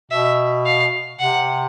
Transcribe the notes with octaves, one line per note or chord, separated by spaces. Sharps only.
B2 E5
F5
C3 F#5